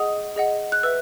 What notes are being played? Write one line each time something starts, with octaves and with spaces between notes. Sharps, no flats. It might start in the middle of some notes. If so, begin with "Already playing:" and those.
Already playing: G#4 D#5 F#5 D#6
G#4 D#5 F#5
F#6
B4 E5 E6